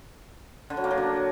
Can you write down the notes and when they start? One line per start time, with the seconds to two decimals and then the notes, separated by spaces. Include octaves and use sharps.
0.70 D3
0.77 F#3
0.84 A#3
0.91 F#3
0.98 D4